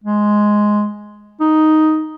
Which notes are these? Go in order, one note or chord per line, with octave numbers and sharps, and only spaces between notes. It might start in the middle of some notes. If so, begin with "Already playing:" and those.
G#3
D#4